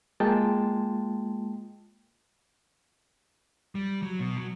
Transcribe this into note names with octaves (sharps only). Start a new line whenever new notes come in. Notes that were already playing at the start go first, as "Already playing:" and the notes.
G#3 A#3 F4 G5 A5
G3
F#3
B2
F#3